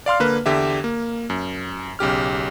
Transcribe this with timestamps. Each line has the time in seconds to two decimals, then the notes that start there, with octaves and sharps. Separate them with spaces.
0.06 D5 F5 C6 F6
0.20 D3 A#3 B4
0.46 E2 D3 G4 E5
0.84 A#3
1.30 F#2
1.99 B1 C#3 G4 F6